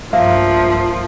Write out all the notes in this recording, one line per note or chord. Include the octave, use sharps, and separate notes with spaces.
B1 G2 F3 A#3 E5